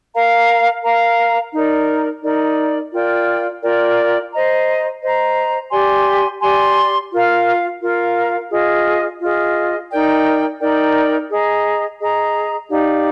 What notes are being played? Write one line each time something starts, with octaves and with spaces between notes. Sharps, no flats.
A#4 F5 A#5
A#4 F5 A#5
D#4 A#4 D5
D#4 A#4 D5
F4 A#4 D5 G5
F4 A#4 D5 G5
C5 D#5 A#5
C5 D#5 A#5
G4 D5 G#5 C6
G4 D5 G#5 C6
F4 A#4 F5
F4 A#4 F5
F4 G#4 D#5
F4 G#4 D#5
D#4 A#4 D5 G5
D#4 A#4 D5 G5
G#4 D#5 A#5
G#4 D#5 A#5
D#4 G4 D5 F5